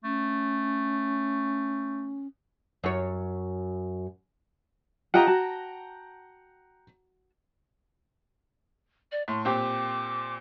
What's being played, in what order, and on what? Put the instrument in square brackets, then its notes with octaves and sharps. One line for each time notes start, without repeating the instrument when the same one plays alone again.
[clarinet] A3 [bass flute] C#4
[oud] F#2 C#5
[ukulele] F4 G4 D#5 [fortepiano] F#5 G5 A#5
[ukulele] F#4 A5
[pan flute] D5
[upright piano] A2 [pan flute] C6
[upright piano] A#2 C4 G4 [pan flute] D6